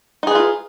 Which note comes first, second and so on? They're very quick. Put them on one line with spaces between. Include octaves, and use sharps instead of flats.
D#4 G#4 B4 F4